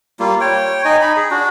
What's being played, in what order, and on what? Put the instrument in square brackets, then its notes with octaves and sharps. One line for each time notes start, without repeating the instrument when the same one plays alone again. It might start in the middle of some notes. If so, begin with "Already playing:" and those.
[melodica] G3 A#3 F4
C#5 G5
D#4 D#5 G#5
D#4 B5
G#4
D4 F#4